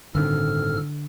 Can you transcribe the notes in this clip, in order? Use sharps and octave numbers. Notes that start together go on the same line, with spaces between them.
G1 A2 D3 D#3 C4 A4 F6